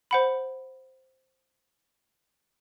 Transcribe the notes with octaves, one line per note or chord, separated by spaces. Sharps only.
C5 F#5 B5